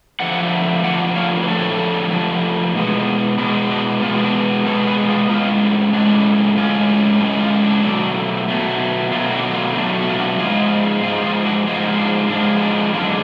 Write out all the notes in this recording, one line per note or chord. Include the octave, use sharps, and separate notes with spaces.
D3 F3 A3 D5 F#5
D3 F3 A3 D5 F#5
C#5 F5
B4
D3 F3 A3 A4 C#5
D3 F3 A3
B2 G#3 B3
B2 G#3 B3 D4 F#4
D4 F#4
B2 G#3 B3 F4
F4
D4 F#4
B2 G#3 B3 A4 C#5
G#4 B4
F4 G#4
A2 G#3 C#4 F4
A2 G#3 C#4 D4
A2 G#3 C#4 F4
A2 G#3 C#4 F4
F4
D4
B2 F#3 A3
B2 F#3 A3
B2 F#3 A3 F4
D4 F#4
F4
B2 F#3 A3 D4 F#4
F4
D4 F#4
G#2 F3 G#3 F4 G#4
G#2 F3 G#3 F4 G#4
F4 G#4
D4 F#4
G#2 F3 G#3 F4
D4
G#2 F3 G#3 D4
D4
F4
D4
F#2 D3 G#3 D4 F4